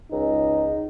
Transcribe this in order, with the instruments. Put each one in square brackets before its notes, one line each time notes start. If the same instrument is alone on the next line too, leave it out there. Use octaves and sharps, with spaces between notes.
[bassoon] C#2 [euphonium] D#4